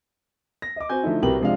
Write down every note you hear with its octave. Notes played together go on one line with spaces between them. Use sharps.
A#6
D#5 D6
C4 F#4 C5 G#5 G6
D3 F3 A3 D#4 E4
C2 F#4 G4 A#4 B4 F#7
C3 F3 G#3 D4 F5